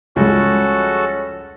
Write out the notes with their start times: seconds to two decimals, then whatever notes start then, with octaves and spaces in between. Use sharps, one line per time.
0.16 C#2 F3 G3 G#3 C#4 F#4 A4